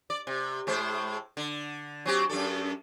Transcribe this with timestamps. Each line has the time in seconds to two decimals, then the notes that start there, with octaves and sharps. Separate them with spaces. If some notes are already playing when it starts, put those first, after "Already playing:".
0.10 D5
0.27 C3
0.67 A2 G#3 C5
1.37 D3
2.06 F#3 C4 G4
2.30 F#2 D4 A4